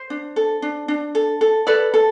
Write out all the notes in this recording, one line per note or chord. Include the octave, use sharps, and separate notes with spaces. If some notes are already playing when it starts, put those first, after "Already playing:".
Already playing: C5
D4
A4
D4
D4
A4
A4
A4 B4 D5
A4